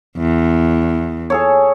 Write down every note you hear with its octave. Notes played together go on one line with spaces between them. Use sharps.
E2
G#4 A4 C#5